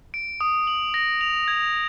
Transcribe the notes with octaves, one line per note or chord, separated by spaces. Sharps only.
D7
D#6
F#7
A#6
F7
G#6